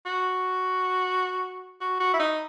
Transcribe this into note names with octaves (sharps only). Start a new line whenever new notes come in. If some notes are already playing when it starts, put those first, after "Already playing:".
F#4
F#4
F#4
E4
D#4